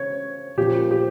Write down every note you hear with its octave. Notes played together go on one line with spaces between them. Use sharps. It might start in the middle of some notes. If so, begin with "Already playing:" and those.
Already playing: C#3 C#5
A#2 F3 A#3 C#4 G4
G4